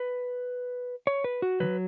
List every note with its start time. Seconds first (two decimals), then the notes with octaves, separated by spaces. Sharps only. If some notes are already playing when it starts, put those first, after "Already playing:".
Already playing: B4
1.07 C#5
1.24 B4
1.42 F#4
1.60 D#3 F#3 B4